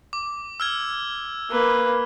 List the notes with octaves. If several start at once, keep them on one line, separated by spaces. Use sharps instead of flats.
D6
E6 F6 G#6
A#3 B4